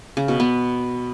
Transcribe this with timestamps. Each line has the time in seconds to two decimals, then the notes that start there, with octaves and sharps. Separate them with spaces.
0.17 C#3
0.28 B2
0.40 B3